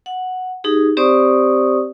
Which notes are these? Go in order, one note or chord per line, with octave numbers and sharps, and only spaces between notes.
F#5
D#4 G4 G#4
C4 G4 C5 D5 C#6 D#6